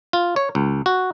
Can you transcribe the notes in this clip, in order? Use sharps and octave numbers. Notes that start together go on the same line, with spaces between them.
F4
C#5
C#2
F#4